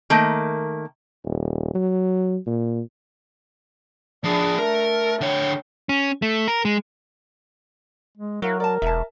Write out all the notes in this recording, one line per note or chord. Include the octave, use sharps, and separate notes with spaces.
D#3 A3 A#3
D#1
F#3
A#2
F3 D4 G#4
A3 A#4
D3 C#5 G5
C#4
A3
A#4
G#3
G#3
F#3 E4 A#4 F5
A#4 D5 A5
E1 E5 A5